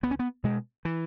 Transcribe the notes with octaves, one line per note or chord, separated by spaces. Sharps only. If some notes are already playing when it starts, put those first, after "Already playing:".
C#2 B3
C#4
B3
B2 G#3
E3